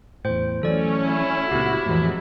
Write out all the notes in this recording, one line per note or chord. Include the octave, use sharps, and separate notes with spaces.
E2 A2 C5 G5
E3 F#3 A3 C#4 A4 D5
E4
C#2 A#2 C4 F#4 G4
F2 A2 E3 F#3 G#3